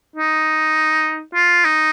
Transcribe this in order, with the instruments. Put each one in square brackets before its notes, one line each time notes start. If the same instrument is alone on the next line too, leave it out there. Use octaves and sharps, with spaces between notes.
[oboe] D#4
F4
D#4